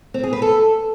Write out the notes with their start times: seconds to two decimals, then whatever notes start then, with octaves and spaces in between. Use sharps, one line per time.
0.14 C4
0.23 G#4
0.33 B4
0.42 A4